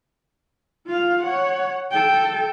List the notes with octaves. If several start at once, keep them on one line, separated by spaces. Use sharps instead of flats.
F4 F5
C#5 F#5
A4 G5